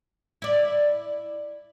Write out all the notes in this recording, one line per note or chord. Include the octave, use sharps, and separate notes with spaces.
E4 D5